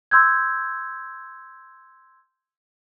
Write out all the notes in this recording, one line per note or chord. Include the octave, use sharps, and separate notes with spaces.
C6 E6 G6 G#6